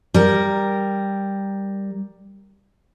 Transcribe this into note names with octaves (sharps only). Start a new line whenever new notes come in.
G3 A#4